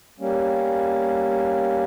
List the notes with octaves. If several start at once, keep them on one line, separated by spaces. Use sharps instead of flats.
G3 A#3 C#4